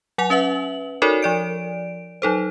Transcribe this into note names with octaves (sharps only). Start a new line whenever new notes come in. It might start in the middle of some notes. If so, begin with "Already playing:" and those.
F#3 F#5 G#5 F7
C#4 B4 E5 F#7
D#4 F#4 A4 A#4 C#5 D5
F3 D5 D7
F#3 D#4 A4 C5